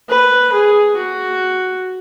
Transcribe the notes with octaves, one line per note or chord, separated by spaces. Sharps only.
B4
G#4
F#4